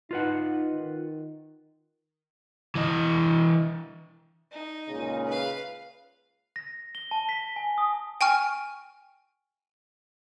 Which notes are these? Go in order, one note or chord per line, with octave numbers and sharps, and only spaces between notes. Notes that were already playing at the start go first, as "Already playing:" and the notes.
D#4 F4 B4 F#5
D#3
E3 D#5
D#4
C#2 A#2 C#3
B4 F5
A#6
G7
A5
B6
G#5
D#6
G5 G#5 C#6 F6